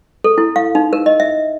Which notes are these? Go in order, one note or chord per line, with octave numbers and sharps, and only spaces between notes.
A4
E4
F5
D#4
A#4
D#5
E5